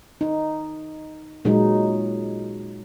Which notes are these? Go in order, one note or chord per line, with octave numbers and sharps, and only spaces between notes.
D#4
A#2 F#3 G#3 D#4